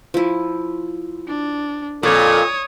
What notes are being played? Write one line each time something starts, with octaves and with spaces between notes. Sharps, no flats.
F3 E4
D4
F2 A#2 A4 C#5 D5 D#6